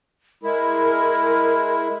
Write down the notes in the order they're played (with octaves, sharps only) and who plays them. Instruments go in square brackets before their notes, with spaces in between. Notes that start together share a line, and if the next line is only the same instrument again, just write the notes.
[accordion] G#3 E4 [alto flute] A#4